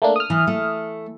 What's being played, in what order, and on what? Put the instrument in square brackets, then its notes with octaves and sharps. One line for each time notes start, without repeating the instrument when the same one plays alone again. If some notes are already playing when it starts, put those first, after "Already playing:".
[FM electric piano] A3 A#3 D4
D#6 F6
[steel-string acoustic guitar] E3
A3